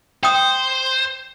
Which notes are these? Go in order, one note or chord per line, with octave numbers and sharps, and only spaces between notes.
C5 G5 D#6